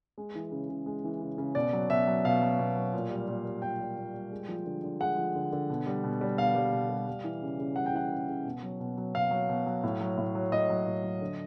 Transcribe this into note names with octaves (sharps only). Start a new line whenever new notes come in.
G#3
E3
C#3
C#3
G#3
E3
C#3
C#3
B2 D5
F#3
B2 E5
F#3
B2 F5
F#3
B2
F#3
A#2
G3
A#2
G3
A#2 G5
G3
A#2
G3
G#3
F3
D3
D3
G#3 F#5
F3
D3
D3
B2
G3
B2
G3
B2 F5
G3
B2
G3
G3
E3
C#3
C#3
G3 F#5
G5
E3 F#5
C#3
C#3
B2
F#3
B2
F#3
B2 F5
F#3
B2
F#3
A2
F#3
A2
F#3
A2 D#5
F#3
A2
F#3
D3